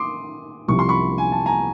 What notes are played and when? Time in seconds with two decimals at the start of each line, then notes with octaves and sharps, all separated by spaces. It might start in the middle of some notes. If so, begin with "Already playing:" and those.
Already playing: C6 D6 D#6
0.68 C2 C3 F3 C#6
0.79 C6
0.89 B5 C#6
1.18 G#5
1.32 A5
1.46 G#5 A#5